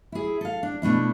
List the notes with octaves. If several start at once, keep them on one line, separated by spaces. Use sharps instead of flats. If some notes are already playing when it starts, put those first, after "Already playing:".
E4 G#4
A4 F5
D4
B2 A3 D4 E4